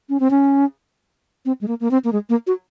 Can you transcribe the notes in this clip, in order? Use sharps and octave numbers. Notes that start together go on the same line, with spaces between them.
C#4
C4
C#4
C4
G#3
A#3
A#3
C4
A#3
G#3
A#3
F#4